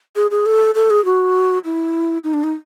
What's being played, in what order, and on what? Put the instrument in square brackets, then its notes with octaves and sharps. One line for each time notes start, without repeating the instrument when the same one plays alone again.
[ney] G#4
G#4
A4
A4
G#4
F#4
E4
D#4
D4
D#4